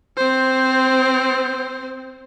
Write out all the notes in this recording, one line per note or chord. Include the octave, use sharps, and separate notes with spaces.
C4 C5